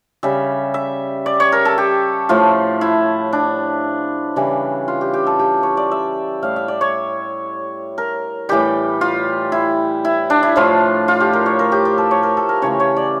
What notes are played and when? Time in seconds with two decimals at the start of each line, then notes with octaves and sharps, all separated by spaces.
0.23 C#3 G3 E5
0.74 E5
1.26 D5
1.40 C#5
1.52 A#4
1.65 A4
1.78 G4
2.29 A2 F3 A3 F4
2.81 E4
3.33 D4
4.36 C#3 E3 G3
4.88 F4
5.01 G4
5.14 G4
5.27 A4
5.39 G4
5.63 C#5
5.77 D5
5.91 E5
6.42 A2 G3 F5
6.56 E5
6.68 D5
6.81 C#5
7.98 A#4
8.49 A2 E3 G3 G4
9.01 F4
9.52 E4
10.05 E4
10.30 D4
10.43 E4
10.56 A2 F3 A3 F4
11.08 F4
11.20 G4
11.33 A#4
11.46 C#5
11.59 A#4
11.72 G4
11.85 G4
11.98 A4
12.11 C#5
12.23 A#4
12.37 A4
12.49 A#4
12.62 C#3 E3 A3 C#5
12.80 C#5
12.96 D5